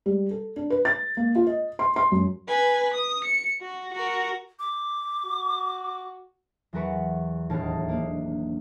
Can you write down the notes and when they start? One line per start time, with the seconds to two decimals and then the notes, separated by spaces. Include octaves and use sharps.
0.06 G3
0.31 A4
0.56 D4
0.70 B4
0.85 A6
1.17 A#3
1.35 F4
1.47 D#5
1.79 C6
1.96 C6
2.12 F#2
2.48 B4 G#5
2.94 D#6
3.24 C#7
3.61 F#4
3.94 F#4 A#4
4.59 D6
5.26 F#4
6.73 E2 F#3 F#4 A#4 B4 C#6
7.50 E1 D#2 A2 D#3 A#4 A5
7.89 A#3 D4